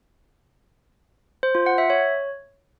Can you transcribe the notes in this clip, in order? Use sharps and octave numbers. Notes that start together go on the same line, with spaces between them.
C5
F4
F#5
E5
C#5